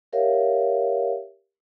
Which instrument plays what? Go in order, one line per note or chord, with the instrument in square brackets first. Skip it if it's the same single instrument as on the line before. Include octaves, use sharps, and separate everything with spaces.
[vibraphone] G4 A#4 C#5 E5 F5